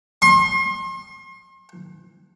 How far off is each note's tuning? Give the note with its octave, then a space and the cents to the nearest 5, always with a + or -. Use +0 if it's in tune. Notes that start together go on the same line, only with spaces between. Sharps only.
C6 +40